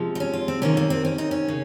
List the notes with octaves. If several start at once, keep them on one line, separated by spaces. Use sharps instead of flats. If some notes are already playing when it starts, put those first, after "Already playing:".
Already playing: C3 F3 G#3
D#4
C#4
F4
C4
C3 D#3 A#3 C#4
A#3
C4
C#4
D#4
C#4
C#3